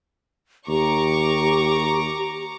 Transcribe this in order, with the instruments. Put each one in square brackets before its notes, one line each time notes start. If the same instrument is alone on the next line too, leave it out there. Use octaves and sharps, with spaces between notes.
[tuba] D#2 [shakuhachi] G4 [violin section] A#5 C#6 D6